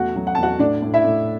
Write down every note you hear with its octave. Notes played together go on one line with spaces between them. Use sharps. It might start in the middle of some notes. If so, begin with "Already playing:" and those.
Already playing: E2 A3 F#4 F#5
F#3
F#5
A5
E2 F#4 F#5
A2 D4 D5
A2
E4 E5
A2